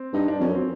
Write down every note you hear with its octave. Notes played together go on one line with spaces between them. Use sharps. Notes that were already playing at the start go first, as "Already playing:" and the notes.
Already playing: C4
G2 D#4
D4
F2 C#4
F#2
C4